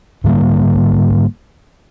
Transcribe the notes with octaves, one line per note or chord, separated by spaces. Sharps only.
G#2 D3 G3 A#3